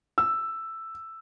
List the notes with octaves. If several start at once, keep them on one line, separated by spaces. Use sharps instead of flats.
E6